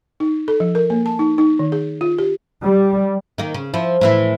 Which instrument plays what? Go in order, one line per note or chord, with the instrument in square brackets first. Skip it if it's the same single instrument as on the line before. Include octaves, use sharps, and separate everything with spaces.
[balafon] D#4
A4
F3
A#4
A#3
A5
D#4
D#4
D#3
G#4
F4
G4
[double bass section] G3
[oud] D#3 A#3
C#3
F3 E4
A2 E3 E4